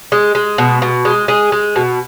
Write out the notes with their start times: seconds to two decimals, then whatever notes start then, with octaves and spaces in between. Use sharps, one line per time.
0.12 G#3
0.35 G#3
0.58 B2
0.82 B2
1.05 G#3
1.28 G#3 G#4
1.52 G#3
1.76 B2